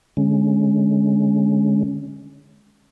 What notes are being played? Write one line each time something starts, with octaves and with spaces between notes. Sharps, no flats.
D3 G#3 C#4